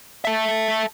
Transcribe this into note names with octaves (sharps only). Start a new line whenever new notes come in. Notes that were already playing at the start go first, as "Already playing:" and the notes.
A4 E5